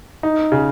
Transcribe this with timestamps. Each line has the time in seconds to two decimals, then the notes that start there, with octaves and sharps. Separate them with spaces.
0.23 D#4
0.52 C#3